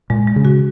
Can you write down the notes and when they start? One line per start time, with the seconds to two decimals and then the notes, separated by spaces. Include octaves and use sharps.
0.10 A#2 G#3
0.27 G#3
0.36 C#3
0.45 F#4